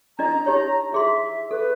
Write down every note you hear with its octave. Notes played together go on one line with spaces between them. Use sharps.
D4 E4 D#5 A#5
D#4 G4 C#5
E4 G#4 E5 C6
A4 B4